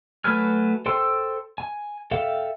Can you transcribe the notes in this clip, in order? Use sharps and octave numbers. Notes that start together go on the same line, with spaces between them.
F#3 A3 B4 G#5 F6
A4 C5 G5 C6 E6
G#5
A4 E5 F5 G5